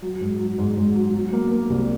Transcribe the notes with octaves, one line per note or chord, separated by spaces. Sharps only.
F#3
G#2
F#3
G#2
G#2
F#3
F#3
A#3
A#3
C2